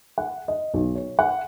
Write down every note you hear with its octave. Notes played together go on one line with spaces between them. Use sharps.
F#5
D#5
B1
C#5
F#5